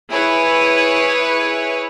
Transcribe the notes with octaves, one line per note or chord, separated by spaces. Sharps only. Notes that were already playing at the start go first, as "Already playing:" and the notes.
E4 G#4 B4 C#5